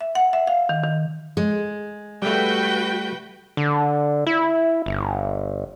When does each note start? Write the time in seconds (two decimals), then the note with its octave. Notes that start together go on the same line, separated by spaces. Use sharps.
0.01 E5
0.15 F#5
0.33 E5
0.47 F5
0.69 D#3
0.83 D#3
1.37 G#3
2.22 G3 A3 F#4 B4 G5
3.57 D3
4.27 E4
4.86 G1